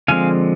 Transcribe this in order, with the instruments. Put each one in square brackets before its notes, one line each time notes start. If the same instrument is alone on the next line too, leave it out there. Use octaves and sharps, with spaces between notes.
[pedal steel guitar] D3 F3 G#3 C4 F5 G#5